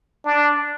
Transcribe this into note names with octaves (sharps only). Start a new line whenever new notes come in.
D4